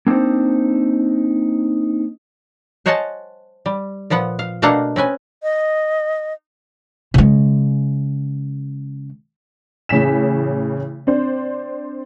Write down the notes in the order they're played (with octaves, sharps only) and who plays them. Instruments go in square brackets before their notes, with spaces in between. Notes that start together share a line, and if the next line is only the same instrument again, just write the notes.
[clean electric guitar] A#3 C4 D4 D#4 C5
[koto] C5 C#5 D#5 F#5 G#5 A5
G3
A#2 F3 B3 F#5
F5
B2 A3 A#3 D4 F5 F#5
C4 C#4 B4 G#5
[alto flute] D#5
[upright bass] C#3 G#3
[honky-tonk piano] A1 C#3 G#5 B6 E7
C4 D4 C5